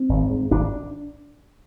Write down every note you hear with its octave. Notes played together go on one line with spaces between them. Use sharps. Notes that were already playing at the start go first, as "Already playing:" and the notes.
Already playing: C4
G#1
G#2
G#1 D4